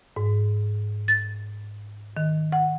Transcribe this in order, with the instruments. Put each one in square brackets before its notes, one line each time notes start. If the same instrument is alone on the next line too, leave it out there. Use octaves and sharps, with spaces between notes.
[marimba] G#2
A6
D#3
F#5